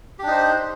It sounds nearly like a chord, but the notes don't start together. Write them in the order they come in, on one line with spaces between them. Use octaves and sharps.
G4 D4 D#4 C5